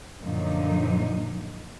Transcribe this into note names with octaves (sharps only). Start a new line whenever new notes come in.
F#2 A#2 D3 F3 D#4